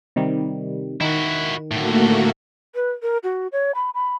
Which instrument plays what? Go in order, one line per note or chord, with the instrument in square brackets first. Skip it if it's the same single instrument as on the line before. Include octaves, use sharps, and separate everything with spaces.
[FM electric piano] C3 D#3 G3
[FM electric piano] D#3 [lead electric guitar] E4 F#4
[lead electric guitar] A2 D3 [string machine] A3 A#3 F#4
[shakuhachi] B4
A#4
F#4
C#5
B5
B5